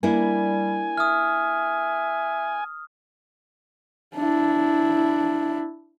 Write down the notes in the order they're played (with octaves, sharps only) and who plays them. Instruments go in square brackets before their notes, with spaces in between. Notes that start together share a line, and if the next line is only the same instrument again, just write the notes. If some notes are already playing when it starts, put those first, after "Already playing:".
[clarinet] G3 [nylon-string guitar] A#3 D4 E4 [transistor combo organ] G#5
[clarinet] E5 [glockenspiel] D#6 F6
[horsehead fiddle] D4 E4